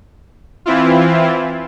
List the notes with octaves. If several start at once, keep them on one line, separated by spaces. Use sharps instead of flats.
E3 C4 E4 F4